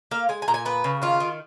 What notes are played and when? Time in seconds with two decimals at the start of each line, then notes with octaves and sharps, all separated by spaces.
0.11 A#3 F5
0.29 G#3 G#5
0.42 G#5
0.48 A#2 A#5
0.54 G#5
0.65 B3 B4
0.84 C#3
1.02 D#3 F4
1.20 D#3